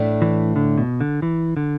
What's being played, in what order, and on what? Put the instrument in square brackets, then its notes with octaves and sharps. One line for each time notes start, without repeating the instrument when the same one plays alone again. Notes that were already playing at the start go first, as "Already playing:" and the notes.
Already playing: [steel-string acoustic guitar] A2 A3 D4
[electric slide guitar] E3
D3
B2
D3
E3
D3